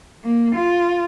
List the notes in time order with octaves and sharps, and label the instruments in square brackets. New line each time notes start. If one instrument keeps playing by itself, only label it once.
[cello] A#3
F4